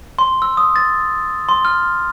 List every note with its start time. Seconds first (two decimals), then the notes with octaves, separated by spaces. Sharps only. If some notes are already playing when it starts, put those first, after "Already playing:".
0.19 C6
0.42 E6
0.57 D#6
0.76 A6
1.49 C6
1.65 F6